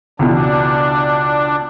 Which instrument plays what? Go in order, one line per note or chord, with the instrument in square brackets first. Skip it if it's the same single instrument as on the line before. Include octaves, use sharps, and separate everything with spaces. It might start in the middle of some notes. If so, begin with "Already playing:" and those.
[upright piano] C#2 B2 E3 [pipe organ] D4